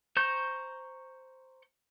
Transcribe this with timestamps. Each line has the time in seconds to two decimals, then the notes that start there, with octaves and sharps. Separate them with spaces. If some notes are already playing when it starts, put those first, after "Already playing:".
0.17 C5 A#5 C#6 G6